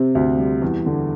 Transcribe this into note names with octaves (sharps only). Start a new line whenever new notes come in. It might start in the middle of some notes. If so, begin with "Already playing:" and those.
Already playing: C3 C4
D2
G3
E2
D3